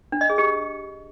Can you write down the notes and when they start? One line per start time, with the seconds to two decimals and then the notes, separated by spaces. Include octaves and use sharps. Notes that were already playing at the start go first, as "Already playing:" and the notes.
0.12 D4
0.21 D#5
0.30 G#4
0.38 G4